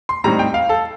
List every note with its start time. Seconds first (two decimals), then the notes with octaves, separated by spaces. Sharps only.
0.09 C6
0.24 A2 G3 C4 D#4 A#5
0.39 G5
0.54 F5
0.69 A4